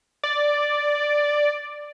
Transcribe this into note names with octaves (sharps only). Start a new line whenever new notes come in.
D5